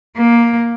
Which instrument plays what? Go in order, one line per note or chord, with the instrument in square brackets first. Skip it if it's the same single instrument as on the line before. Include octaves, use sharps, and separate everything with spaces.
[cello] A#3